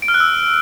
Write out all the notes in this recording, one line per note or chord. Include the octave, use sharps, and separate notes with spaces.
D7
F6
F#6
E6